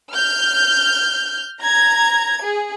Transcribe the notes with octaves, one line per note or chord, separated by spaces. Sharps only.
F6 G6
A#5 G#6
G#4